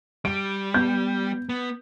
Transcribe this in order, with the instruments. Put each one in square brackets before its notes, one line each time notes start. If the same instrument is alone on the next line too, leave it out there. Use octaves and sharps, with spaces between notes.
[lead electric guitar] G3 [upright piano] D7
[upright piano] B3 G6
[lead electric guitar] B3